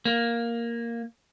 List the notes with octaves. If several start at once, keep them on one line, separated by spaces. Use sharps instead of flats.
A#3